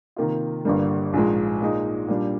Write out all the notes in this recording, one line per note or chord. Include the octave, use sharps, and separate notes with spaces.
C3 D#3 A#3 F4
G1 G2 D3 G3 A#3
A#1 G#2 F3 G#3
A#2 G#3 D#4
A#2 G3 D4